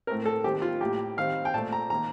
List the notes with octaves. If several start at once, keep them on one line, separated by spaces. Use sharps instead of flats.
A2 A3 C4 A#4
A4
D#3 G3 C4 G4
F4
A2 G3 A#3 G4
D#3 G3 C4 F5
G5
A#2 A3 C4 A5
A#5
D#3 A#3 A#5